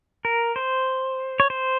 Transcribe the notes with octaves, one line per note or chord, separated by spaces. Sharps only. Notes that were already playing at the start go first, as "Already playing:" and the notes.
A#4
C5
C#5
C5